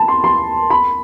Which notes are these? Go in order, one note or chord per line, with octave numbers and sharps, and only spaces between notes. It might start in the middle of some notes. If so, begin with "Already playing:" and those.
Already playing: A5 B5
C6
C6
B5